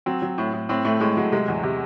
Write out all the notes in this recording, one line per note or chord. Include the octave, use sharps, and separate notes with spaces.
F#3 C4
F#3
A2
A2
A2 C4
A2 A3
A2 G#3
F#3 G#3
C3 G#3
E2
C3